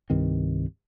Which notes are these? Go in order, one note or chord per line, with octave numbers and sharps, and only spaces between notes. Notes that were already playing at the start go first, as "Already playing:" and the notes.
C2 G2 D#3 C4